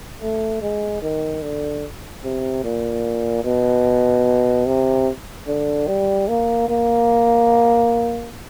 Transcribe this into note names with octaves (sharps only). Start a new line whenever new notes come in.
A3
G#3
D#3
D3
C3
A#2
B2
C3
D3
G3
A#3
A#3